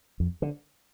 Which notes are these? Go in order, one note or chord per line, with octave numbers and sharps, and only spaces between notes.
F2
D3